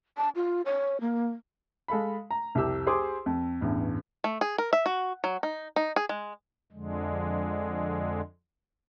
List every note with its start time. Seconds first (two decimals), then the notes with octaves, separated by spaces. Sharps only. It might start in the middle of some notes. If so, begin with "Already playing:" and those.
0.17 A5
0.36 F4
0.66 C#5
1.01 A#3
1.88 G#3 A4 F5 B5
2.31 A#5
2.55 C2 F2 G4 E6
2.86 G4 G#4 C5 C6 D6 D#6
3.26 F2
3.61 A1 E2 G2
4.24 A3
4.41 G#4
4.58 A#4
4.73 E5
4.86 F#4
5.24 F#3
5.43 D#4
5.76 D#4
5.96 G#4
6.09 G#3
6.72 F2 D3 G#3